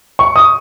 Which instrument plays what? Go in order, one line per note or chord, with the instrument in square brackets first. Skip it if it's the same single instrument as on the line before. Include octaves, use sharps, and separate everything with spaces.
[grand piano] C#6
D#6